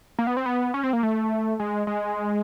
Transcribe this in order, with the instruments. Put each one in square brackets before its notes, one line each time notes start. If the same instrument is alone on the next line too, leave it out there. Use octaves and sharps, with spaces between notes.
[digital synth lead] A#3
B3
C4
B3
C#4
C4
A#3
A3
G#3
G#3